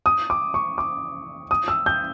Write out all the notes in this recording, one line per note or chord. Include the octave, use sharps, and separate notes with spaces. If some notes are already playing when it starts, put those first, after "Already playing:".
D#6
D6
C#6
D6
D#6
E6
G6